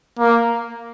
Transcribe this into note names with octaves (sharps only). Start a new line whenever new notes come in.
A#3